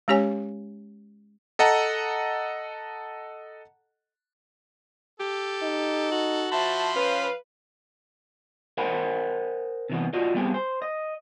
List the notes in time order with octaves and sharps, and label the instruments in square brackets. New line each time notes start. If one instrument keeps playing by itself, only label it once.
[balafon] G#3 C#4 G4 C#5 G#5
[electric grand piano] A4 D#5 F#5 A5 A#5
[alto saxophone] G4 [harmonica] A4
[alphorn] D#4
[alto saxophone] F#4
[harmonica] F3 C5 B5 [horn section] E5 A5
[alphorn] C#4 [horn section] B4 F5
[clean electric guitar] A#4 C5 D#5 F#5 G#5 B5
C3 E3 B3
F4 F#4 D5 D#5
G3 B3 C4 G4 G#4
C5
D#5